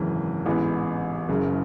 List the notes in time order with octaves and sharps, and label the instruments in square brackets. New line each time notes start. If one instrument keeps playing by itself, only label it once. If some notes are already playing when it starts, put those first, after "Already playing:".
Already playing: [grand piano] G#1 F#2 C#3 E3
A1 G#2 E3 B3
F#1 F#2 C#3